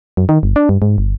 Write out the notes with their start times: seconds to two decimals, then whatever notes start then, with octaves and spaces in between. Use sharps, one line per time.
0.17 F#2
0.29 D#3
0.43 G1
0.56 D4
0.69 G2
0.82 G#2
0.98 G1